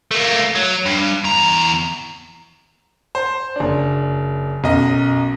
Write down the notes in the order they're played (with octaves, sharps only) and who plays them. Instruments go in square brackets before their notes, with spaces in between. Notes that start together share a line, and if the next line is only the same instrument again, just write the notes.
[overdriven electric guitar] A3 A#3
F#3
G2
E2 A#5
[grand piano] C5
F#1 D4
B1 F#2 D#5